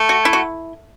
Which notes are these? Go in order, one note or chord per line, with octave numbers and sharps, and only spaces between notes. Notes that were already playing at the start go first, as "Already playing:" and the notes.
Already playing: A3
F#4
E4
F#4